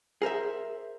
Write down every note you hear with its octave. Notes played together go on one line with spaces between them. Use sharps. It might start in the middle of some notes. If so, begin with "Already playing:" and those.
G#4 A#4 C5 E5